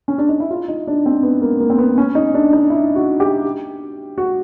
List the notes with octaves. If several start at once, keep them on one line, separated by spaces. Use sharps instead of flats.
C#4
D4
D#4
E4
F4
D#4
D4
C4
B3
A#3
A#3
C4
B3
C#4
D#4
D4
D#4
E4
F#4
G4
F#4